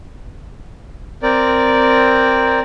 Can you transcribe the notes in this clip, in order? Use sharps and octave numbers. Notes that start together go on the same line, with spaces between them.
C4 A#4 D5